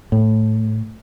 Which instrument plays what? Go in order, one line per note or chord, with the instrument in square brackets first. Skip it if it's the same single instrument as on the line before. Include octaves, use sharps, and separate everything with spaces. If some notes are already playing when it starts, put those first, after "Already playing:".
[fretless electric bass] A2